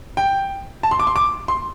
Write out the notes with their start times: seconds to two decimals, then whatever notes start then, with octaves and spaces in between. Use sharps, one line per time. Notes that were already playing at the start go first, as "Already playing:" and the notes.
0.17 G5
0.83 A5
0.91 C6
0.99 D6
1.07 C6
1.16 D6
1.48 C6